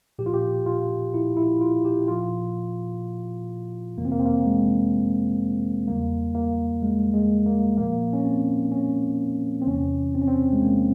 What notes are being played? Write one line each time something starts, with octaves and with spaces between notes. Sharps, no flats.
A#2 F3 G4
F4
G4
F4
E4
E4
F4
G4
A#2 F3 F4
F2 C3 E3 A#3
C4
A#3
C4
A#3
G#3
E2 C#3 G3 A#3
A#3
G#3
G#3
A#3
A#2 F3 A#3
C#4
C4
C#4
C4
E2 C3 E3 C#4
C4
C#4
C4
G#3
A#3